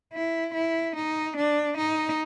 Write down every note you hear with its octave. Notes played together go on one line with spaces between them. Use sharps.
E4
E4
D#4
D4
D#4